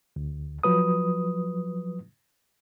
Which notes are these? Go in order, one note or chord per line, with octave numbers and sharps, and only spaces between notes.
D2
F3 F#3 B4 D#6